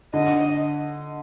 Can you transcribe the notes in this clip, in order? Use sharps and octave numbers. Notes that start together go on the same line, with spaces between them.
D3 D#5